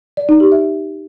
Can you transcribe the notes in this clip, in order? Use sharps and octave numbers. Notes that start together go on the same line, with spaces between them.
D5
D#4
G4
E5